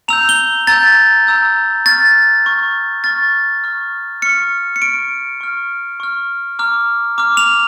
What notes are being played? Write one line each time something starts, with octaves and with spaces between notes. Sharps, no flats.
A#5 E6 G6 F7
G7
A#5 E6 G6 A6
A#5 E6 G6
C#6 F6 A6
C#6 F6
C#6 F6 A6
C#6 F6
C#6 F6 C#7
C#7
C#6 F6 D7
C#6 F6
C#6 F6
A#5 D6 F6
A#5 D6 F6
F7